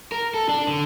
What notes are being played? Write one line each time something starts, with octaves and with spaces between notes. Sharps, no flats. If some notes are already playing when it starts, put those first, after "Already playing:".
A#4
A4
D4
D3